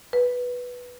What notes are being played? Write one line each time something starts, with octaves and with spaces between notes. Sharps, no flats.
B4